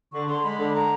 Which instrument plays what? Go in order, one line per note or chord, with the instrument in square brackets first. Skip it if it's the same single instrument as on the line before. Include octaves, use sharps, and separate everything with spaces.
[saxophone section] D3 [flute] C#6
[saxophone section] D3 [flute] C6
[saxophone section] G#3 [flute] B5
[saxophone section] D3
[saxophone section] D3 [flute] A#5